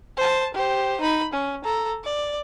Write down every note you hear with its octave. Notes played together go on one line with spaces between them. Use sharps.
C5 A5
G4 C5
D#4 B5
C#4
A4 A#5
D5